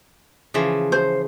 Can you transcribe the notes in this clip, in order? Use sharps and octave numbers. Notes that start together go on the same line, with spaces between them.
C#3 E3 F3
C5